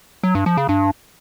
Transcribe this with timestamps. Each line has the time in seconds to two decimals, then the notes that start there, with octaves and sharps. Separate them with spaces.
0.23 F#3
0.35 G2
0.46 F3
0.57 C#3
0.69 G2